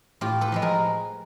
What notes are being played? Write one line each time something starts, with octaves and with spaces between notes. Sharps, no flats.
A2 F4 G4
A4 B4
F3 G#3 B4
G#4 A#4